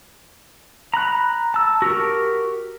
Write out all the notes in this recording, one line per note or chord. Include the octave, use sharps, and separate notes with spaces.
A#5 B5 F#6
A5 E6
F#4 G4 A#4